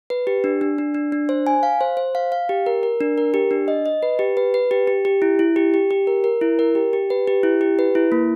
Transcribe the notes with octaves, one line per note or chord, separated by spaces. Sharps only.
B4
G4
D4
D4
D4
D4
D4
C5
G#5
F5
C5
C5
F5
F5
G4
A#4
A#4
D4
A#4
G4
D4
D#5
D#5
B4
G4
B4
B4
G4
G4
G4
E4
E4
G4
G4
G4
A#4
A#4
E4
A#4
G4
G4
B4
G4
E4
G4
B4
E4
A#3